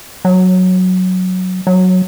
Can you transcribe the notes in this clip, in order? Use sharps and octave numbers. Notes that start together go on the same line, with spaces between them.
F#3
F#3